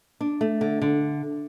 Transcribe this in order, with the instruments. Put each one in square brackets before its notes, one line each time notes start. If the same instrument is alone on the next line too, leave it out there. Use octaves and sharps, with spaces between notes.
[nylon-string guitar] D4
A3
D3
D3